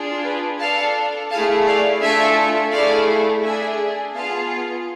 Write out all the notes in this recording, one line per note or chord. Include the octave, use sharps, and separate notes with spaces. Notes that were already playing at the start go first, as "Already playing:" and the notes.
Already playing: D4 F4 G#4
B4
D4 A4 F5 A5
A3 E4 G#4 F5 A5
D5 F5
A3 D4 F4 A4 E5 G#5
A3 E4 G#4 D5 F5
D4 G#4 E5 G#5
B3 F4 G#4 F5 A5